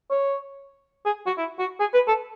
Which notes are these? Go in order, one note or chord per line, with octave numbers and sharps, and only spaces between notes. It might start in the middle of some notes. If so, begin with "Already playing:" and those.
C#5
G#4
F#4
E4
F#4
G#4
B4
A4